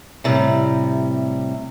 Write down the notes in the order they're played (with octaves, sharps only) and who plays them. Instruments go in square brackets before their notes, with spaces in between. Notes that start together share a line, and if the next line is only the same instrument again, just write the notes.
[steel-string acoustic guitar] A2 C3 G3